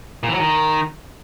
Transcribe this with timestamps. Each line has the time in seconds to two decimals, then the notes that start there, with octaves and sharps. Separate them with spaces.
0.23 A#2
0.29 E3
0.34 F#3
0.40 D#3